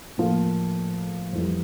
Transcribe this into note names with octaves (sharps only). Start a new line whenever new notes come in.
A2 F3 A#3 F4
F2 E3 G3